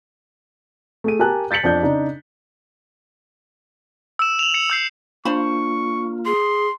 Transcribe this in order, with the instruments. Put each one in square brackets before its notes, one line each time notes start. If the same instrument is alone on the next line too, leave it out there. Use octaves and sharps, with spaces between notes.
[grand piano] A3 G#4 D#7
G4 A#4 G#5 A5 F#6
G6 A6 B6 C#7 F#7
F2 D4 G6
C#3 D4 D#4
[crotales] E6 E7
F7 F#7
C#7
E6 G6 C7
[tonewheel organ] A#3 F4 [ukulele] D4 C5 B5 [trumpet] C#6
[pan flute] G#4 [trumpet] C6